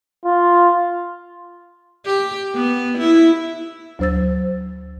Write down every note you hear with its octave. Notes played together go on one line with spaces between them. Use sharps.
F4
G4
B3
E4
D2 F#3 C5 E6 A6